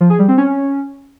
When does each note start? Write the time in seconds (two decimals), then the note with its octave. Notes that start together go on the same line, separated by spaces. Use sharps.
0.01 F3
0.10 G#4
0.19 G3
0.28 C4
0.38 C#4